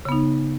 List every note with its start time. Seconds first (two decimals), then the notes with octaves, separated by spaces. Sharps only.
0.05 C#3
0.09 B3
0.12 D#4